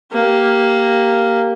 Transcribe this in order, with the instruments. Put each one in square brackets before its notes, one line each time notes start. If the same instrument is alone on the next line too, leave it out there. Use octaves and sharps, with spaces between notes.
[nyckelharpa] A#3 G4